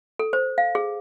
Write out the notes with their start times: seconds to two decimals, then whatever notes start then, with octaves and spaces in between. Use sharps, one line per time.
0.19 A4
0.33 C5
0.58 F5
0.75 G#4